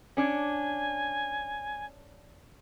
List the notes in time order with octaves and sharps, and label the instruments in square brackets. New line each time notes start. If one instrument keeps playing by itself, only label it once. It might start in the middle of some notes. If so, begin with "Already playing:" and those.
[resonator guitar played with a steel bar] C#4 D4 [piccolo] G#5